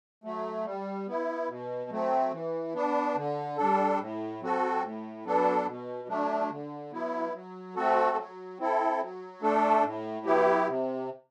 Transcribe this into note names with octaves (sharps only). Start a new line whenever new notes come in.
F#3 A3
G3
B3 E4
B2
F#3 A3 C4
E3
B3 D4
D3
G3 D4 A4
A2
F#3 C4 F#4 A4
A2
F#3 B3 D4 A4
B2
F#3 A3 D4
D3
F#3 B3 E4
F#3
A3 C4 F#4 A4
F#3
C4 E4 A4
F#3
A3 D4 A4
A2
F#3 B3 E4 G4
C3